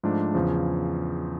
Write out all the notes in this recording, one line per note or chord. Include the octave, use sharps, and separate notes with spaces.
G#2 F3 A3 D4
E2 C#3 F3